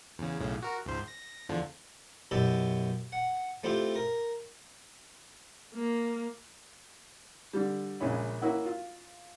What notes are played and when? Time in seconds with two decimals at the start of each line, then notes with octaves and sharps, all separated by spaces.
0.19 E2 C#3
0.40 B1 A2 C#3
0.63 F#4 A#4
0.86 C#2 G#2 C5
1.08 A#6
1.49 E2 D3 F3
2.31 F#2 B2 E4 G4 E5 A5
3.12 F#5
3.64 A3 C4 E4 F4 G4
3.95 A#4
5.74 A#3
7.53 D3 G3
8.00 A#1 C#3 G#3 C#4 B5
8.42 A#3 C#4 E4 F#4
8.66 F4